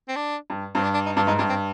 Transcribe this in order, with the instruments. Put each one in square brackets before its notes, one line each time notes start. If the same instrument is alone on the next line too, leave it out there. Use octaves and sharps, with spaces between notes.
[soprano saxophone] C4
D4
[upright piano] G2
[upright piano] G2 [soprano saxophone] C4
[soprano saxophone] D4
D4
D#4
[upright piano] G2 [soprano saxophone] D4
[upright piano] G#2 [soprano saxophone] D#4
[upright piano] G2 [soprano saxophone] D4
[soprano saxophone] C4